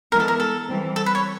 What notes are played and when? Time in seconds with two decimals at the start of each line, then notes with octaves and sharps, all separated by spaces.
0.12 E3 G#3 B3 E4 A#4
0.20 A4
0.28 A#4
0.40 A4
0.68 E3 G3 C4
0.96 A4
1.06 B4
1.15 C#5